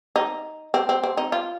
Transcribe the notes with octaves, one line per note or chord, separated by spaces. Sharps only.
D#4
C4
C4
C4
D#4
F4